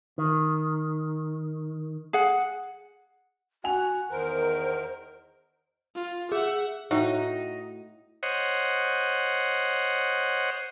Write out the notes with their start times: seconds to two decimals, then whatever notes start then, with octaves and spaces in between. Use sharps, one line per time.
0.18 D#3
2.13 G#4 F#5
3.64 F#4 F#5 G#5 F7
4.10 E2 D#3 A#4 C5
5.96 F4
6.32 G#4 E5 F#5
6.91 A2 D#4 F#4
8.23 C5 C#5 D#5 F#5